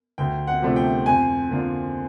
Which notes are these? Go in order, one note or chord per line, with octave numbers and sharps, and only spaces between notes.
D2 G5
F#5
C3 F3 A3 D4
G5
F2 G#5
D3 F3 A#3 D4